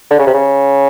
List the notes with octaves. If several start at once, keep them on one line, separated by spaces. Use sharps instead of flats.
D3
C#3
C3
C#3